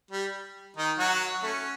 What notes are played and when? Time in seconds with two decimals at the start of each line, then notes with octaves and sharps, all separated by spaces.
0.11 G3
0.76 D#3 D#4
0.98 F#3 F#4
1.43 A3 C#4